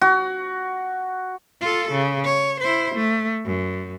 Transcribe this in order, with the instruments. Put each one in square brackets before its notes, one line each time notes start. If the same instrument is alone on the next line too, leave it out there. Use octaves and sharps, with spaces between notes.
[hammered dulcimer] F#4
[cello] F4 A4
C#3
C#5
E4 C5
A3
F#2